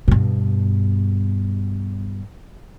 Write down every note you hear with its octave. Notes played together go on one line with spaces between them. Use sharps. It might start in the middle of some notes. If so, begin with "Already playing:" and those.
G2 B2